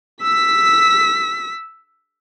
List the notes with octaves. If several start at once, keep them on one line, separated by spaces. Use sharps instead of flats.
E6 B6